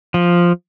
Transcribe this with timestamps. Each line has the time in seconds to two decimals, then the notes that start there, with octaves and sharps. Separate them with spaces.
0.14 F3